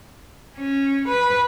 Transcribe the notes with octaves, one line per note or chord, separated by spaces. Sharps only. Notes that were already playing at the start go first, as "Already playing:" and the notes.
C#4
B4